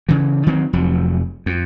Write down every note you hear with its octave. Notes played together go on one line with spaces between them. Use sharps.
C#3 E3
D#3 F#3 C4
F1 F2 F#3
F2